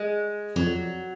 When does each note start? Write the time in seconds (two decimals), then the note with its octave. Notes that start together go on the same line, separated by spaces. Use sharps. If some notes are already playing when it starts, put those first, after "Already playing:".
Already playing: G#3
0.56 F2 F#3